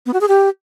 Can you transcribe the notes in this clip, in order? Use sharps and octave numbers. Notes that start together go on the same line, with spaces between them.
B3
F#4
G#4
G4